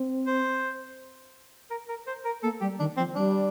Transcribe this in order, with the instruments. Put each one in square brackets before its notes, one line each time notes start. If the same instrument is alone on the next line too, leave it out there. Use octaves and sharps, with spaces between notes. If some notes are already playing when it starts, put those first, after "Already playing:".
Already playing: [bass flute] C4
[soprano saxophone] C5
A#4
A#4
C5
A#4
[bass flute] A#3 [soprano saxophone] A4
[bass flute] G3 [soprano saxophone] G4
[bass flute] D#3 [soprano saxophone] D4
[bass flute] F3 [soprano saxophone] C4
[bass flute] G3 [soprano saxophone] D4